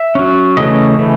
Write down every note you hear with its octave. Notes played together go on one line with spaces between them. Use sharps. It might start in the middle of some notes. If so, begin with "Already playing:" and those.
Already playing: E5
F#3 C#4
C#3 E3 A3 C#4 D#5
C#3 E3 A3 C#4